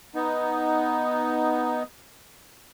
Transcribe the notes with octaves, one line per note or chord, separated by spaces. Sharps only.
B3 D#4